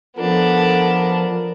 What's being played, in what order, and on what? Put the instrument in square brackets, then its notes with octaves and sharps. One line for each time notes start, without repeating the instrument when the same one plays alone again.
[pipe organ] F3 [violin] B3 D4 [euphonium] A4 [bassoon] A#4